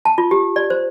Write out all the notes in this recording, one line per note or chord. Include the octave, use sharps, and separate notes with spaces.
A5
F4
G4
D5
C5